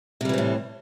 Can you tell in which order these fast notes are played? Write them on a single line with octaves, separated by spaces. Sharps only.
C3 G3 E3 C4 A2